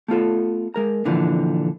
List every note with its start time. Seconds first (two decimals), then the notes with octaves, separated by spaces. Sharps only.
0.08 A3 B3 F4 A4
0.74 G#3 A#4 A#5
1.05 A#2 D3 E3 F3 D4